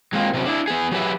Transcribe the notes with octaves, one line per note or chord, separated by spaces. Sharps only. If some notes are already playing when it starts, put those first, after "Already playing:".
F#3 G#3 A#3 C4 F4
C3 F#3 A#3 C#4
D4 E4
B3 G#4
F#3 G4 G#4 B4 E5